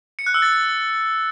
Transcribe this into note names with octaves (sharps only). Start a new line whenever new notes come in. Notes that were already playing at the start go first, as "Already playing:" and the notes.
C#7
F#6
E6
A6